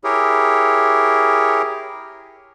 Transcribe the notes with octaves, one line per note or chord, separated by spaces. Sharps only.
E4 G4 G#4 A#4 C#5